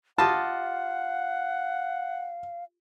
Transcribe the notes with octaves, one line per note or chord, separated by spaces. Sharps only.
F4 G4 D#5 F5 F#5 A5